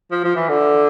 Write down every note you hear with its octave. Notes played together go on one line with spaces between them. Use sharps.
F3
F3
E3
D3